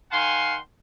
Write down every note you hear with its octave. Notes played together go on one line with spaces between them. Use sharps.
D#3 F5 F#5 G#5 C6